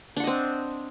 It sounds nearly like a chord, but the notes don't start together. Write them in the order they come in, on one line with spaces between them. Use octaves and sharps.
D4 F#5 D#5 C4